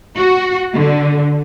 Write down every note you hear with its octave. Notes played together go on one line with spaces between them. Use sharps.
F#4
D3